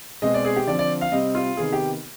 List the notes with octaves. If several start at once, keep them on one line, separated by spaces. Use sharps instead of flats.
B2 G#3 C4 D#5
D5
G#4
G4
D3 F3 C4 D5
D5
F5
C3 G3 C4 D#5
F4
C3 D#3 B3 G#4
G4